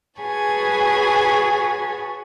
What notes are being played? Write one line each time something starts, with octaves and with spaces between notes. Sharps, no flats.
F#4 G#4 B4 C#5 G#5 A5